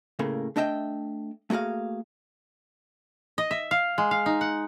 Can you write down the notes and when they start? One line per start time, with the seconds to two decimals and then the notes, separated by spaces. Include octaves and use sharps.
0.19 A2 C#3 A3 A#3
0.56 A3 D4 D#5 E5 G5
1.50 A3 A#3 F#4 G#4 F5
3.38 D#5
3.51 E5
3.71 F5
3.98 G#3
4.11 F5
4.26 D#4
4.41 F#5